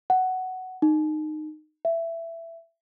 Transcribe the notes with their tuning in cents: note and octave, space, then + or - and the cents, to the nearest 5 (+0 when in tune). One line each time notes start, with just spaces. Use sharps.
F#5 +10
D#4 -20
E5 +15